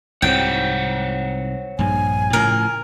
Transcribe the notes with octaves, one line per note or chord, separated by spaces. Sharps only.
C2 G#2 C3 C5 C#5 F#5 G5
A#1 G2 G#5
A2 C#3 F3 A#4